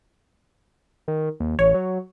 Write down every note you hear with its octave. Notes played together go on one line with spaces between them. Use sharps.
D#3
D#2
A1 C#5
F#3